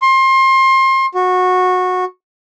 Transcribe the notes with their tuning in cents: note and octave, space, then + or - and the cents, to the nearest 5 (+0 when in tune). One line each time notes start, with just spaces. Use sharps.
C6 +30
F#4 -15